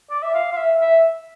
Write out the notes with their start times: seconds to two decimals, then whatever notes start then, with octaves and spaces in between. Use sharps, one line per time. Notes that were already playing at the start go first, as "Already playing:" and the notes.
0.10 D5
0.23 E5
0.34 F5
0.52 F5
0.57 E5
0.81 E5